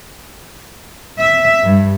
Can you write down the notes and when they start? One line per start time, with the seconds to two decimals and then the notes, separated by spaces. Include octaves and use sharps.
1.19 E5
1.62 G2